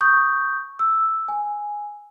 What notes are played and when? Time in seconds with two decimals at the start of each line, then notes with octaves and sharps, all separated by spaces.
0.01 C#6 D#6 G6
0.79 E6
1.28 G#5